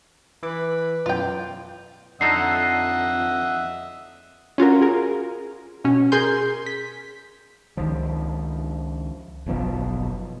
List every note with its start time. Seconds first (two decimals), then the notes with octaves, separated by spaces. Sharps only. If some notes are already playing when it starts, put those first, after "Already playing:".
0.43 E3 B4 D6
1.06 F#2 B2 F4 G5
2.21 F2 D3 D#4 A4 D#5 E5 F#5 C7
4.58 C#4 F4 F#4 A#4
4.82 G#4 A#4
5.84 B2 C#4
6.12 G#4 A#4 G#5 C6 G6
6.66 B6
7.77 C#2 D#3 F3
9.46 F#1 B1 B2 F3